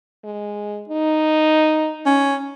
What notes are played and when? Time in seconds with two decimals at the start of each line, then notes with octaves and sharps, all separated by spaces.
0.24 G#3
0.89 D#4
2.06 C#4